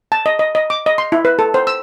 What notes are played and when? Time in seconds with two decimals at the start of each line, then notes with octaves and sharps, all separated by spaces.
0.12 A5
0.26 D#5
0.39 D#5
0.55 D#5
0.70 D6
0.86 D#5
0.98 C6
1.12 E4
1.25 B4
1.39 A4
1.54 C5
1.67 E6